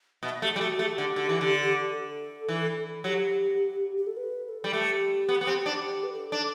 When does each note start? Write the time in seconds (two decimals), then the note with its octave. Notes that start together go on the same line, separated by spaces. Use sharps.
0.23 B2 E5
0.42 A3 G4
0.56 G3
0.61 A3 F#4
0.79 A3 A4
0.83 G4
0.98 D3
1.16 D3
1.29 E3
1.41 D3
1.91 A4
2.49 E3
3.04 F#3 G4
3.97 G4
4.07 A4
4.17 B4
4.44 B4
4.49 A4
4.64 G3
4.73 A3 G4
5.29 B3
5.41 B3
5.47 C4
5.66 D4
5.85 G4
6.04 B4
6.13 A4
6.32 D4